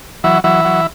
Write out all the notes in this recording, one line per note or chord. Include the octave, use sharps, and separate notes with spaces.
E3 F#3 E4
E3 F#3 E4
F#3